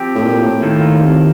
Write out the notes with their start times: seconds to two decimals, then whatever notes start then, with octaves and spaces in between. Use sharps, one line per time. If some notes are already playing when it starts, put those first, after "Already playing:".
Already playing: F3 C4 G4
0.15 A2
0.23 A#2
0.42 A2
0.62 D#3 A#3 F4 A4
1.02 C3